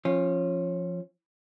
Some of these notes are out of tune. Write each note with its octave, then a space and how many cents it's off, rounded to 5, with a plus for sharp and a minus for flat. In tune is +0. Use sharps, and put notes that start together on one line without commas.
F3 +0 C#4 -25